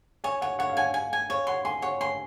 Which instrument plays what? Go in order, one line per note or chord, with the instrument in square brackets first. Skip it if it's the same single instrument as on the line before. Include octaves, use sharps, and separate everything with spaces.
[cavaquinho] C#5 [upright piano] G#5
[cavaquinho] C#5 [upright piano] F#5
[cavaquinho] C#5 [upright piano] F#5
[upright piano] F5
[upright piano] F#5 [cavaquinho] G#5
[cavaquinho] G#5
G#5
[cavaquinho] C#5 [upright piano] F5
[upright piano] F#5 [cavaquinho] C6
[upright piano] G#5 [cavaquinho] C6
[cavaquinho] C#5 [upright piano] F#5
[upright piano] G#5 [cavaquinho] C6